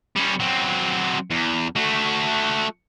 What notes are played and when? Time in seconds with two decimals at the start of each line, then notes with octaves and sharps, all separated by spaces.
0.16 G3 C#4
0.40 F#3 C4
1.31 E2
1.76 A3 F#4